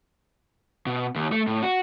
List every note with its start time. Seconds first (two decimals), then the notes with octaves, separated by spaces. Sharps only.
0.86 B2
1.16 D#2
1.32 A3
1.47 A2
1.63 F#4